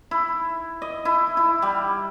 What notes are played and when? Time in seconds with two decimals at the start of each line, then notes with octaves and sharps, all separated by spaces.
0.11 E4
0.82 D#5
1.05 E4
1.37 E4
1.62 G3